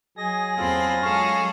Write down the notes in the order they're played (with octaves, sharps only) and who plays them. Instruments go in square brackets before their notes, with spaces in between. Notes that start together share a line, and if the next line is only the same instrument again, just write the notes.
[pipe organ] F#3 G#5 A#6 [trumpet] G#4 [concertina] D#5
[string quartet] E2 C4 B5 [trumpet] F4 [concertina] G#4 A4
[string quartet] G#3 G#4 A4 [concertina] C#4 C#5 F5